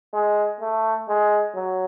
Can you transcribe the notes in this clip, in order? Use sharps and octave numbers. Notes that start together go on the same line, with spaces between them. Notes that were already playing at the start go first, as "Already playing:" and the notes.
G#3
A3
G#3
F#3